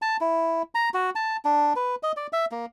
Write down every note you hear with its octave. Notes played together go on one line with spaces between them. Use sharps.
A5
E4
A#5
F#4
A5
D4
B4
D#5
D5
E5
A#3